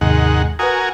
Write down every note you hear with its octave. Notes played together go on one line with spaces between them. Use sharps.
D#2 G#2 C3 D#3 G#3 F#5
F#4 A#4 B4 F#5 G#5 D#6